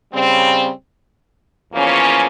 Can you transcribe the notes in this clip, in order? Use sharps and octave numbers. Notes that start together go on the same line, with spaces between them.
C#3 G3 C4
E2 C#3 F3 A#3 C#4